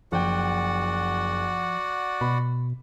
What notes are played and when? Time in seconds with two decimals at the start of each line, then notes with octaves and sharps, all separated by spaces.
0.12 F#1 F3 F#4 D5 F#5 G5
2.21 B2 B5